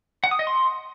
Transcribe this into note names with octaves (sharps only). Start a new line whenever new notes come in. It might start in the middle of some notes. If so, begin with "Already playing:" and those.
F#5
D#6
D#5
C6